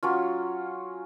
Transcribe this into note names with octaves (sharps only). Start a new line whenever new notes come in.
F#3 C#4 F4